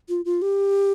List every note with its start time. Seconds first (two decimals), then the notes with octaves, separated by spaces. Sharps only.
0.09 F4
0.25 F4
0.42 G4